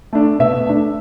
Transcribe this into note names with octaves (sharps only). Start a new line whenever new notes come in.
A3 D4
B2 E5
A3 D4